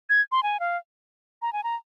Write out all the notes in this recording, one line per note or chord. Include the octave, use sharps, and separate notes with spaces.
G#6
C6
G#5
F5
A#5
G#5
A#5